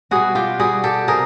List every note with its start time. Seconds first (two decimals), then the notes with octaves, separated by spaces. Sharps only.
0.11 B2 G3 F#4 G#4
0.35 F4 G4
0.59 B2 G3 F#4 G#4
0.84 G4 A4
1.07 C3 G#4 A#4